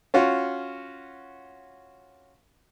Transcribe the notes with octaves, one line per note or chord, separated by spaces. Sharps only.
C#4 F4 F#4